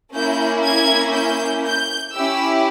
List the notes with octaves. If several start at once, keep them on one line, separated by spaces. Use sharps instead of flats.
A#3 C#4 E4 G6
G#6
G6
G6
C#4 E4 G4 E6